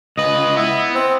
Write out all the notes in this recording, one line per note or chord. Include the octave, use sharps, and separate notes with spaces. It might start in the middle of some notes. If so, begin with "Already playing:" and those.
C#2 B4 D#5
B3 E4
C4